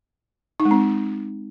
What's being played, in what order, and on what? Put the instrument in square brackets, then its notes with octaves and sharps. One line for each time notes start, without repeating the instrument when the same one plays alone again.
[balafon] D#4
G#3
C4